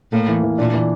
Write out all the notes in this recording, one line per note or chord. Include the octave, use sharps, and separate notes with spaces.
A2 A#3
E3
E3
A#2 D4
E3